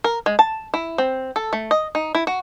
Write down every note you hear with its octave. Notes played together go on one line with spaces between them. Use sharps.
A#4
G#3
A5
E4
C4
A4
A3
D#5
D#4
E4
F#4